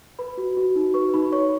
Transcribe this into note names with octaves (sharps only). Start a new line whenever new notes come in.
B4 B5
F#4
F#4
D#4
B4 C#6
D#4 B5
C#5 C#6